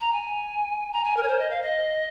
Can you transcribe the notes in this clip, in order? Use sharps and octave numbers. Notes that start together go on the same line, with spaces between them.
A#5
G#5
A#5
G#5
A#4
C#5
C5
D#5
F5
D#5